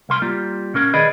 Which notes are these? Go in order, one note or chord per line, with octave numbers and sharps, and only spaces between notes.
C2 A#4 C6
G3 A#3 F4
A#2 C#4 A#4
D#3 G#4 B4 D5 D#5